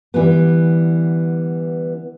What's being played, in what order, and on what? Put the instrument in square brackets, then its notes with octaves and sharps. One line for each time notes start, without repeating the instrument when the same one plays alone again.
[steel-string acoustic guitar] D3 E3 G3 B3